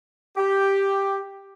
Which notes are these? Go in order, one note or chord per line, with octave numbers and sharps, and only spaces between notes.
G4